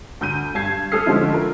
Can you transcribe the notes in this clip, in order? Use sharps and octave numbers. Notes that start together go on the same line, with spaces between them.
D2 G6 D#7
G2 A5 G#6 C7
A3 G#4 A4 D#6 F6 C7
D3 F3 G#3 C#4 D#4 E4
F4 A4 A#4